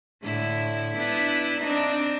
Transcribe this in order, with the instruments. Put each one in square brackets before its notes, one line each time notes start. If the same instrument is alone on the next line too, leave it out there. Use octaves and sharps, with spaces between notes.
[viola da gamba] A2 D3 E4
B3 D4 E4
C4 D4 D#4